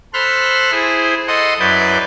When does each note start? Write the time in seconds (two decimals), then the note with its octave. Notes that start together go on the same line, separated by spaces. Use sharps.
0.14 A4 C5 B5 C6 F6 F#6
0.71 E4 G#4 C5
1.28 A4 D#5 F#5 C6
1.59 F#2 E4 B4 D5 G6